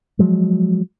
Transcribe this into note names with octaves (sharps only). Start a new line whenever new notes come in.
F3 F#3 G#3